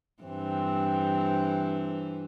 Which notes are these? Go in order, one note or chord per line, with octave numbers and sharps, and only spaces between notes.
G2 E3 C4